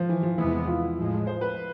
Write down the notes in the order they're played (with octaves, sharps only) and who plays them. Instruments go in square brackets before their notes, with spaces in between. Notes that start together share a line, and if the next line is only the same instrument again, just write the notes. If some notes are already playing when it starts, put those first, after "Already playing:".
Already playing: [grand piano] F3
E3
F3
[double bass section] E2 C3 G#3 B3 [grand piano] E4
[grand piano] F4
[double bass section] A2 F3 G#3
[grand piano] C5
B4